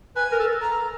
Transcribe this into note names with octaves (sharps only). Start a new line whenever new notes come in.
B4 G#5
A#4
A4
A#5